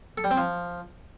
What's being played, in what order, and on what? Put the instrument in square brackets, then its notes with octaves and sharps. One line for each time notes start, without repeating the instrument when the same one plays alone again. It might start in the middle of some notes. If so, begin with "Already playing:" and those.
[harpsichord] A4
G3
C4
F3